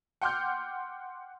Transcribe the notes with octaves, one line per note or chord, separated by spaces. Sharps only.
F#5 G5 C6 D6 F6 G6